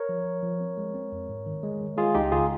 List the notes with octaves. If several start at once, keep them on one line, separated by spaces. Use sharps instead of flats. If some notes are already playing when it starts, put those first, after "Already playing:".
Already playing: A#4 C#5
F3
F3
F3
C4
G#3
C4
F2
G#2
D#3
G#3
D#3
G#3 F4 G#4
C#2 D#4 G4
C#3 F4 G#4